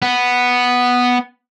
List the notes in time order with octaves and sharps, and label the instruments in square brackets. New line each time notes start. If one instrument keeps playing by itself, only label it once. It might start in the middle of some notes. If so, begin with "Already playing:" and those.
[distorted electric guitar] B3